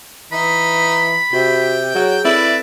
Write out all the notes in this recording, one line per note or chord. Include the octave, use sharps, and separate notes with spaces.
E3 D#4 B5
C3 F#4 G5
F#3 G#4 C#5
C4 E4 A4 B4 D5 E5